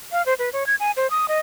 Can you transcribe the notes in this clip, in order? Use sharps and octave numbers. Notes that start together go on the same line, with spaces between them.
F5
C5
B4
C#5
G#6
G#5
C5
D#6
D#5